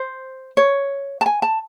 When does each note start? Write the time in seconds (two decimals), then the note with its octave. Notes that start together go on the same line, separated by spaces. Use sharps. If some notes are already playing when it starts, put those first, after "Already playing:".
Already playing: C5
0.57 C#5
1.21 A5
1.26 G#5
1.42 A5